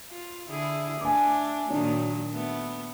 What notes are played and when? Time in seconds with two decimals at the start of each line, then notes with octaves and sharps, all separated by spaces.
0.11 F4
0.48 D3 E4 G#4
1.01 A3 D4 G#5 D6
1.70 A#2 D#3 F#3 D4
2.32 A3 B3